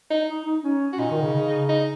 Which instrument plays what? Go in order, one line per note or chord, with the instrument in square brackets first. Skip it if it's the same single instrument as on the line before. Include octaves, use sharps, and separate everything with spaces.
[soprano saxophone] D#4
[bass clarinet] D#4
D#4
C#4
[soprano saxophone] F#4
[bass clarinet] A#2 [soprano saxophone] D#4
[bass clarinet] D#3
C#3
C#3
[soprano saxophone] D#4